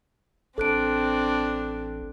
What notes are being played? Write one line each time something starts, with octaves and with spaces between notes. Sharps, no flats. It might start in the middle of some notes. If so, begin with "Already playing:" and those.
A1 C4 D4 A4 F#6 D7